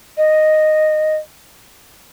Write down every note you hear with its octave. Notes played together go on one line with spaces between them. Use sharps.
D#5